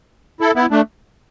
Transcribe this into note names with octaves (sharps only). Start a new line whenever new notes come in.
E4 A4
B3 E4
A3 D4